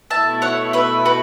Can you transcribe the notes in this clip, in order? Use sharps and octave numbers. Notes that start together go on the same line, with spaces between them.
B2 A3 E4 E5 A5
C#5 F#5
B4 E5
F#4 B4